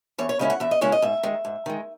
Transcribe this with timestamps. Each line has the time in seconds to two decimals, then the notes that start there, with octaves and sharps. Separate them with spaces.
0.18 E2 C#5
0.29 C#5
0.39 C#3 G#3 C#4 E4 D#5
0.50 F#5
0.60 E2 E5
0.71 D#5
0.81 C#3 G#3 C#4 E4 C#5
0.92 D#5
1.02 G#2 E5
1.23 D#3 G#3
1.45 G#2
1.66 D#3 G#3